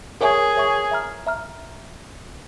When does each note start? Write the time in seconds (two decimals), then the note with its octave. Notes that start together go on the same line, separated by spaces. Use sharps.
0.20 G#4 A#4 C#5 E5 G#5 C#6
0.56 A#4 C#5 E5 G#5 C#6
0.91 E5 A#5 F6
1.27 E5 A#5 F6